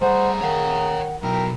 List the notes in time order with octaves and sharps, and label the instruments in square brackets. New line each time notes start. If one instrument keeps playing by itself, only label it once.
[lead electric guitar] G3 [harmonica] A3 G#4 A#5 [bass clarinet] C5 [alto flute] F#5
[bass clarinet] D#3 [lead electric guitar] C#5 F5 [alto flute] F#5
[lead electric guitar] B2 F#3 [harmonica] E4 A#4 [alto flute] G5